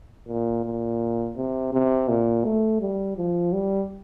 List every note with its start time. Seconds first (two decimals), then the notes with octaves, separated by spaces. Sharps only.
0.28 A#2
0.65 A#2
1.37 C3
1.73 C3
2.09 A#2
2.45 A3
2.81 G3
3.17 F3
3.53 G3